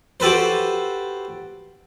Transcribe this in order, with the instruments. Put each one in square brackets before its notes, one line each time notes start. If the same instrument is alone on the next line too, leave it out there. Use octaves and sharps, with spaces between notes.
[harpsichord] F#4 G4 A4 B4 C5